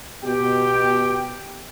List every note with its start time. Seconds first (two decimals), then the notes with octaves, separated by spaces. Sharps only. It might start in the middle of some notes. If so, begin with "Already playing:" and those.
0.24 B2 G4 G5